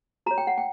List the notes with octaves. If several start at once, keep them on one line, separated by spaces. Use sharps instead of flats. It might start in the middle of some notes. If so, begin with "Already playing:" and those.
F#4 C#5 A#5
G5
F#5
G5